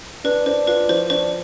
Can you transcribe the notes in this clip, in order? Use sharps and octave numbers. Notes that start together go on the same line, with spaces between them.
D4 B4
D4 C5
F4 B4
F3 C5
D4 C5